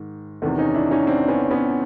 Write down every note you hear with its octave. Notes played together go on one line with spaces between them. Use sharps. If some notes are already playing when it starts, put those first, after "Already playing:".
Already playing: G#2 D#3
E2 C3 D#3 A3
C#4 D#4
D4 E4
C#4 D#4
C4 D4
B3 C#4
B3 C#4